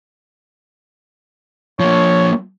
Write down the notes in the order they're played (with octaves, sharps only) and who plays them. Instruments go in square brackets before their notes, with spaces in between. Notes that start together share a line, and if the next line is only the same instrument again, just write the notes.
[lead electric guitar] F3 A#3 [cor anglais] C#5